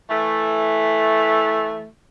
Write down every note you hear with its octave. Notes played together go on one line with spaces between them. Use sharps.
E3 A3